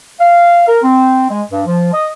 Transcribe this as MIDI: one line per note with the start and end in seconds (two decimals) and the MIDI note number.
0.20 0.66 77
0.68 0.80 70
0.83 1.29 60
1.30 1.43 56
1.52 1.62 43
1.66 1.92 53
1.93 2.10 75